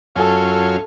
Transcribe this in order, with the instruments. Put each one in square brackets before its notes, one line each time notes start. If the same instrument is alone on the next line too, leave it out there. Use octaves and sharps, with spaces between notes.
[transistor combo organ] F#2 C#4 F4 [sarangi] A4